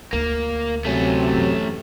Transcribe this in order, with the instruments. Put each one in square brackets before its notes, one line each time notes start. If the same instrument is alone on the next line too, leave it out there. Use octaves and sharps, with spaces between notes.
[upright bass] D2 [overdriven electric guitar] A#3
[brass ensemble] C3 F#3 [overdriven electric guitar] A3 C#4
[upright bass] F#2 E3